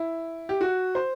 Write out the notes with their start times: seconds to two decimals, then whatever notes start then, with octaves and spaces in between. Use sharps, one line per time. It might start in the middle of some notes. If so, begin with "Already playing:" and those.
Already playing: E4
0.49 G4
0.61 F#4
0.95 C5